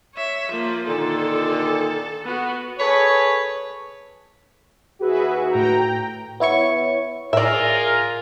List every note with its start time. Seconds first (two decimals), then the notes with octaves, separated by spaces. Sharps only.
0.14 C#5 E5
0.50 F3 A#3
0.88 A#2 D3 D#3 A4
2.25 B3 F#4
2.79 G#4 A4 B4 C#5
5.01 D#2 F#4 G#4 B4 E5
5.51 A2 G5 A#5
6.40 B3 E4 C#5 C#6
7.33 A2 F4 G#4 A#4 D5 E5